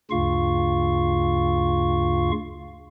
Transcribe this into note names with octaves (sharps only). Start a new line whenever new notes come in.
D2 G2 C#3 F4 F5 C#6